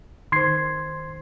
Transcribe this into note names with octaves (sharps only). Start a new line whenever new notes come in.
D#3 C5 C6 G#6 C7